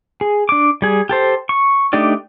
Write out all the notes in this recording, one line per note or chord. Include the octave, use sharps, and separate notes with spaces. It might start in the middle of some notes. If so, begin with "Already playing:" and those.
G#4
D4 D6
G3 G#4
G4 A4 C5
C#6
A3 D4 D#4 G4 D5